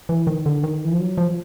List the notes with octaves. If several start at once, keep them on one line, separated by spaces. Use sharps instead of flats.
E3
D#3
D3
D#3
E3
F3
F#3
F3